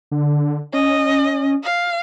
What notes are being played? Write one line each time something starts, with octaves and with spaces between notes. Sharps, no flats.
D3
C#4 D#5
F5